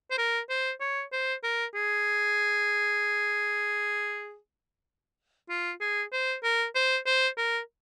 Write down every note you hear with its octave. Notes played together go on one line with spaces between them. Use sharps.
C5
A#4
C5
C#5
C5
A#4
G#4
F4
G#4
C5
A#4
C5
C5
A#4